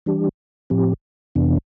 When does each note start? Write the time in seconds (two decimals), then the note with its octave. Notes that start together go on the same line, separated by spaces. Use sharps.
0.06 E3 G3 D4 G4
0.70 A2 F3 C4 G4
1.35 F2 C3 E3 B3 D4